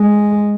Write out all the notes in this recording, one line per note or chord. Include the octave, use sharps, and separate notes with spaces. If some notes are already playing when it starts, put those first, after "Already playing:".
Already playing: G#3